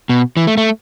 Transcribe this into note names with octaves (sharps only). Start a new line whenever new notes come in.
B2
E3
A3
A3